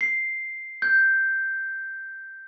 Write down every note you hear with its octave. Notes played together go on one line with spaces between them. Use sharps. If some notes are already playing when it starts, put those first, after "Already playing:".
C7
G6